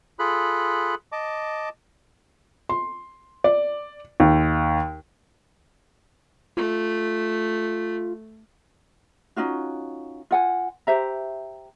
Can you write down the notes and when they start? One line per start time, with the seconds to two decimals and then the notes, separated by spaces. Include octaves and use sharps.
0.19 F4 G#4 A4 B5 F#6
1.12 D#5 A5 D6
2.69 C6
3.44 D5
4.20 D#2
6.57 A3 F4
9.36 C#4 D#4 F4 F#4
10.31 F4 F#5 G#5
10.87 G4 C5 E5 A#5